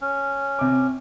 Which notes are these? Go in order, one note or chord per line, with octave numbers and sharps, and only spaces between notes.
C#4
C3 D6